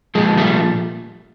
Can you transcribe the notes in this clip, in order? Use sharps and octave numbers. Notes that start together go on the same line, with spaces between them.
A#2 F3 G#3
G3 A3